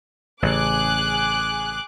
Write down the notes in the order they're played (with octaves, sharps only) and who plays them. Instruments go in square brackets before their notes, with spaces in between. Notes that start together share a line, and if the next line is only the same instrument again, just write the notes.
[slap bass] A1 C#3 [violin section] G#4 D6 F#6